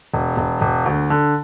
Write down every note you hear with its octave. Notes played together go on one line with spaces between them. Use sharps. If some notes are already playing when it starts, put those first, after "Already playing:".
E1
E1
E1
D2
D3